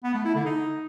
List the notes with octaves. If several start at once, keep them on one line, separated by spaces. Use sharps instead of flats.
B3
A3
E4
D3
D#4